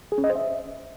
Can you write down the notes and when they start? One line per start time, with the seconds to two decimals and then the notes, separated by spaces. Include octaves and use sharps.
0.12 G#4
0.18 C#4
0.24 D#5
0.30 C5
0.36 E5